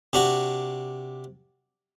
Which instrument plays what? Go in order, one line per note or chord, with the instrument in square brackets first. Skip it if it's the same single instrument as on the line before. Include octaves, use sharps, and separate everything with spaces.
[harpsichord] C3 D4 F#4